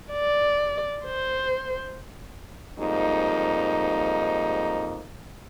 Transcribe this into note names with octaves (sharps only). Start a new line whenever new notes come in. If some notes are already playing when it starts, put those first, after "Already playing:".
D5
C5
F2 G#2 G3 A#3 D#4